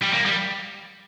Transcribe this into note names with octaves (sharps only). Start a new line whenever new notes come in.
G3
A#3
G3